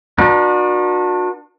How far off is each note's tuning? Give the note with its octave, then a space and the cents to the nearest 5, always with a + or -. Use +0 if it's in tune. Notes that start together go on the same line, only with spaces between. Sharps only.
D4 +25 F#4 -35 A#4 +45